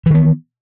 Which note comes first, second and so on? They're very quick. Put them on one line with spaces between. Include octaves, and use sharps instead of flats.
E3 D#3 B3